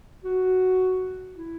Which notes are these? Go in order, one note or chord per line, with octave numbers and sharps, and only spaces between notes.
F#4
E4